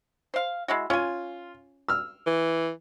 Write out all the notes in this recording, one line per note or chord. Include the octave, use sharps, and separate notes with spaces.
C5 F5
G#3 E4 F#4
C#4 F4 G#5
E6 F6
E3